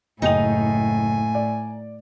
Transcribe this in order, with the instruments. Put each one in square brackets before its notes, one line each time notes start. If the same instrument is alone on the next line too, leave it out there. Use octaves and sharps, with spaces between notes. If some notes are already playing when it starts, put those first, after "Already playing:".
[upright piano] F#1 G5 F7 [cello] A2 [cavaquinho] D#4 D#6 [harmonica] G#5
[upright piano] D5